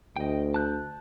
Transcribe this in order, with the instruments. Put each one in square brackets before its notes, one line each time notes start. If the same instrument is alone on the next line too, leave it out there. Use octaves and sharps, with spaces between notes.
[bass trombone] D2 [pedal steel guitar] D#5 G5
[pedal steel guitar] A5 F#6 G6